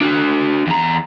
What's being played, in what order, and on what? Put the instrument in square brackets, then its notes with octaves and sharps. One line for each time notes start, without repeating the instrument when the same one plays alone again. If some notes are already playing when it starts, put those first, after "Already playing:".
[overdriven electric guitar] D4 F#4
E2 A#5